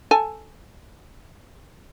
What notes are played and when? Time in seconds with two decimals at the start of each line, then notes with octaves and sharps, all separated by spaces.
0.11 A4 G#5